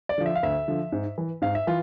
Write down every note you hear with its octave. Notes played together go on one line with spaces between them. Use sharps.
D5
D3 F3
E5
F5
D2 E5
D3 F3
G#2
E3
G#2 F5
E5
E3 F4